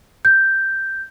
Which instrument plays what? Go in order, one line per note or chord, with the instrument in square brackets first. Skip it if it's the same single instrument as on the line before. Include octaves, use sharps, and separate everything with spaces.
[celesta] G6